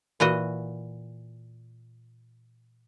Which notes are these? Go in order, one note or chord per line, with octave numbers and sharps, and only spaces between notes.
A#2 E3 F#4 D#5